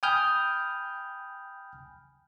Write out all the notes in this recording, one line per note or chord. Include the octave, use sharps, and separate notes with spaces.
G5 G#5 B5 D#6 F6 G6